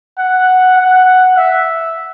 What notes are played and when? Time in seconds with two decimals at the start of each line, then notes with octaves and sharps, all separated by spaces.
0.19 F#5
0.78 F#5
1.37 E5